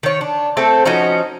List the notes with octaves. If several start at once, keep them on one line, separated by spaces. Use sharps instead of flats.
D#3 C#5
D4
A3 C4 A4
F3 C#4 D#4 F#4